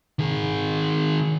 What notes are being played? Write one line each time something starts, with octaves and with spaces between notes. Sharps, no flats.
D#3 G#4